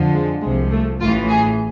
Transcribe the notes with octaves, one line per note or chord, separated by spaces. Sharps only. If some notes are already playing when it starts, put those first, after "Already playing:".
Already playing: F2 D3 F3
G#3
C2 C3 F3 G#3
A3
A1 A2 E3 F4
G#4